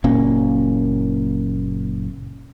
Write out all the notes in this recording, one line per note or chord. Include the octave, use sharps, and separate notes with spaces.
F#1 A#2 A#3 C#4